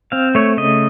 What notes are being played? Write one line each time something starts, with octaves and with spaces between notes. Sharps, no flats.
C4 F5
A3 C#5
C#3 D#5